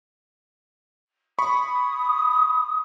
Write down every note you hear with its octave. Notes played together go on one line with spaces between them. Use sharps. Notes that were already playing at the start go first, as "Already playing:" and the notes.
B5 C#6 D#6